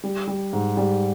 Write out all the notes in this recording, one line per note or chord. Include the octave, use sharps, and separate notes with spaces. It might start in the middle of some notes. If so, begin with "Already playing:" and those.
G3
G3
G#2
G3